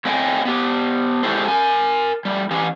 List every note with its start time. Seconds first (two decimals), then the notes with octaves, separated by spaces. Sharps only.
0.05 A3 C4 C#5 D#5 G5 G#5
0.45 B3 G4
1.23 G#3 C#4 E4 G4 A4 C5
1.48 A#4 G#5
2.25 G3 A3
2.51 E3 C#4 G4